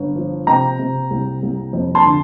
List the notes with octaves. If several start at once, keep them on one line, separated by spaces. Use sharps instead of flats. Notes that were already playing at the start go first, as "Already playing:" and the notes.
Already playing: G1
F3
C3 G5 A#5
C3
C2
C2
F2
A5 C6
D3